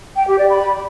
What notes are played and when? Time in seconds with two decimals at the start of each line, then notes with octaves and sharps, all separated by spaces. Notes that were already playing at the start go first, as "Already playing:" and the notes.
0.15 G5
0.27 G4
0.38 D5
0.49 B5